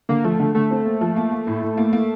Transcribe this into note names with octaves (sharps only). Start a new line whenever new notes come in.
D3 A#3
F3 A3
D3
D3 A3
C4
A#3
F3
A#3
A#3
A2
A2
A#3
A#3